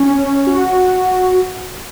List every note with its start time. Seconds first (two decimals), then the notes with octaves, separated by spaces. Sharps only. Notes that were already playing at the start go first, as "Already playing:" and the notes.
Already playing: C#4
0.47 F#4